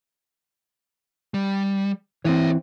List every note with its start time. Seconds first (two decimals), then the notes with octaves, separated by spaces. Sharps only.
1.34 G3
2.25 E3 C4 C#5 E5